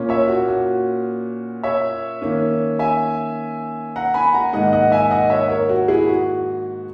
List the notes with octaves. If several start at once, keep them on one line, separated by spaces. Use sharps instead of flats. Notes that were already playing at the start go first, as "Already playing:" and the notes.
Already playing: A#2 A#3 C#4
C#5 E5
F#4
F#4
C#5 E5
D#3 A#3 C#4
E5 G#5
F#5 A#5
G#5 B5
F#5 A#5
G#2 D#3 A#3 D#5 F#5
D#5 F#5
E5 G#5
D#5 F#5
C#5 E5
A#4 C#5
F#4
E4 G#4
F#4